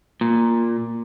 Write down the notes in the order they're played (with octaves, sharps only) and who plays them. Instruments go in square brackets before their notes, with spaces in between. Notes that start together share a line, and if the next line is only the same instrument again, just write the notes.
[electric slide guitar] A#2